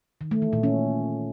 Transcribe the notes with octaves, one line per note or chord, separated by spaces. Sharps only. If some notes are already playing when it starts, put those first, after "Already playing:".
D#3
A3
E3
A#2
C#4